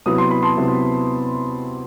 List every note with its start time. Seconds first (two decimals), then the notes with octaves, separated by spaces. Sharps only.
0.06 C3 F#3 B3 E4 D#6
0.18 C6
0.31 B5
0.42 A5 C6
0.57 C3 F#3 B3 E4